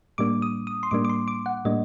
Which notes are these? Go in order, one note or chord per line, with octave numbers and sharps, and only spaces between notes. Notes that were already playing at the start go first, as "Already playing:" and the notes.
A2 G3 A#3 D4 D6
D#6
D#6
C6
A2 G3 A#3 D4 D6
D6
C6
D6
F#5
A2 G3 A#3 D4 D#5